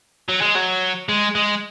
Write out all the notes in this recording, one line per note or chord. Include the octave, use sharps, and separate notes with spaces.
F#3
G#3
F#3
G#3
G#3